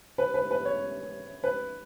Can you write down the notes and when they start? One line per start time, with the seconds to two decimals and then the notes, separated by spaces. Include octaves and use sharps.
0.18 B4
0.34 B4
0.51 B4
0.65 C#5
1.44 B4